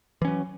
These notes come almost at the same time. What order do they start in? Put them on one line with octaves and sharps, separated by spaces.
E3 C#4 F#3